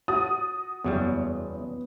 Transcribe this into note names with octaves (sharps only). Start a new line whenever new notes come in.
F#4 D#6 A6
F#1 E2 F#3 G3 B3